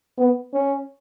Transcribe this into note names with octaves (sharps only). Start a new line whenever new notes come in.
B3
C#4